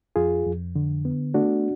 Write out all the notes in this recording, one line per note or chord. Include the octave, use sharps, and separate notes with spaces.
F2 F4 G#4
F2
D3
B3
A3 D4 F#4